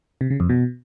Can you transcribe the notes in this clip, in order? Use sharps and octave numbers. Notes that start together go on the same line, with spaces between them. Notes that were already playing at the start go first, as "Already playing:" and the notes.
C3
C#3
F2
B2